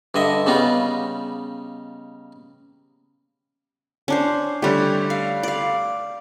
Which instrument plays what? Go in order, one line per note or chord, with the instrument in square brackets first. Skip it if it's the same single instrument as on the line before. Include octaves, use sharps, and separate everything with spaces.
[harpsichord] G2 D3 D#5 E5
C#3 G3 B3 D#4 F4
[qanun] C#4 D4 C5
[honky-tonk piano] D3 G3 A3 [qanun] G4 C#5
[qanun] F5
D5 F5